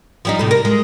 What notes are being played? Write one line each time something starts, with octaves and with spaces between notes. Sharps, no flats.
F3 G3 D#4
A2 C3
A#4
G#3